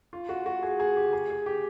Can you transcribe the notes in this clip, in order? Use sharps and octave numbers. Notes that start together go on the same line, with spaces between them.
F4
F#4
F#4
G#4
G#4
G4
G#4
G#4
G4